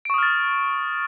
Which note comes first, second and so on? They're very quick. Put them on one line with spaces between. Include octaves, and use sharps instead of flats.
D7 C#6 D#6 F6 A6